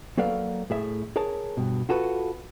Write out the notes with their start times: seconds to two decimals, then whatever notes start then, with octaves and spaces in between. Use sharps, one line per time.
0.17 F#3 A#3 A4 B4 D5 F5
0.70 A2 G#4 E5
1.16 G#4 A#4 C#5 A5
1.57 G2 B2
1.89 F4 F#4 A4 B4